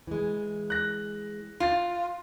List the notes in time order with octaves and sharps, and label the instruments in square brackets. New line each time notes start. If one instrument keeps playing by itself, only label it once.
[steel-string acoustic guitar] E3 G#3
[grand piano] F#6 A#6
[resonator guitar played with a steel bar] F4 [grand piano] C6 A6